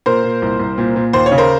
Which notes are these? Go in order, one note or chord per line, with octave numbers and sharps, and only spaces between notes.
A#2 A#4 C5
A#2
C2
C2
A#2
A#2
D#2 C5
C#5
C#3
A#4 C5